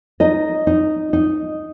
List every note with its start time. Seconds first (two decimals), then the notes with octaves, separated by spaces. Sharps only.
0.20 D#4 D#5
0.67 D#4
1.13 D#4